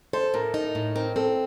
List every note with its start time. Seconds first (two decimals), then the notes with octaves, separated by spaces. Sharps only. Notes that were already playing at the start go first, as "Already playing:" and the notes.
0.13 A4 C5
0.34 A2 A#4
0.54 D#4
0.75 A2
0.95 C4 A#4
1.16 C4 A4